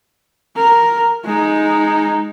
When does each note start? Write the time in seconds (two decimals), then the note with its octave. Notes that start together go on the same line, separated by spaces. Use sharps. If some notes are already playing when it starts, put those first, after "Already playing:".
0.56 A#4
1.25 G#3 D#4